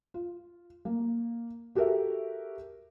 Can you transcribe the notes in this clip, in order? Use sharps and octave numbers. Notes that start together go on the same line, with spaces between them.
F4
A#3
F#4 G4 A4 A#4 E5